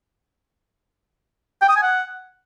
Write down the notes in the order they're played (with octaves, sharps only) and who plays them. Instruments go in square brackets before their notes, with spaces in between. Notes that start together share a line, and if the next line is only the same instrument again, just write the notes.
[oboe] G5
D#6
G#5
F#5